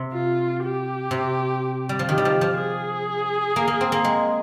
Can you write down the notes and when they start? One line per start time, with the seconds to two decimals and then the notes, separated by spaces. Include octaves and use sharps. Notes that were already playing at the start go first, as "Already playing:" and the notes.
Already playing: C3
0.13 F4
0.63 G4
1.11 C3
1.89 G3
1.99 F3
2.09 D#3 G4
2.18 G3
2.25 F3
2.41 F3
2.58 G#4
3.56 A#3
3.68 A#3
3.81 C4
3.92 A#3
4.04 G#3